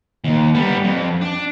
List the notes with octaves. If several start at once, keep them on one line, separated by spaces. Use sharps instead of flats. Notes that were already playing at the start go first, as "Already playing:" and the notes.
D#2
G3 B3
F2
D4